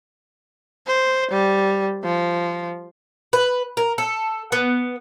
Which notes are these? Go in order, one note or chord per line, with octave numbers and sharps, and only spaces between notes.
C5
G3
F3
B4
A#4
A4
B3